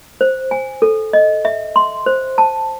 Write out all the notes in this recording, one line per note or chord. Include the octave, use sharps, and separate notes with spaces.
C5
G#5
A4
D#5
E5
C6
C5
A5